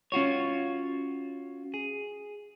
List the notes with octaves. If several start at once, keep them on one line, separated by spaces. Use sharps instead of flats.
C#4 F4 F#4 C#5
G#4